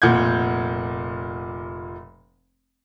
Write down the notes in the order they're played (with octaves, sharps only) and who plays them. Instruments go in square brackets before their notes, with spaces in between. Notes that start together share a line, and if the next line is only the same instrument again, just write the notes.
[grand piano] F1 A#2 F#5 G6 G#6